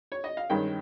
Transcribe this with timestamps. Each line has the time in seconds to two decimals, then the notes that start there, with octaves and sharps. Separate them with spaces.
0.12 C#5
0.24 D#5
0.37 F5
0.50 G2 D#3 G#3 C#4 G5